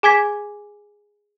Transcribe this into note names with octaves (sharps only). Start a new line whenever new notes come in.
G#4 G#5 D6 G#6 B6